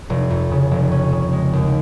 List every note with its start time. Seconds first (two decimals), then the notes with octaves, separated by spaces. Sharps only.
0.10 F1
0.30 F2
0.51 C#3
0.71 F1
0.92 C#4
1.12 C#3
1.33 G#3
1.53 D#2